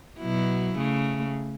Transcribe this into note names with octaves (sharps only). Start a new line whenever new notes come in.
B2 F#3 E4
C#3 A3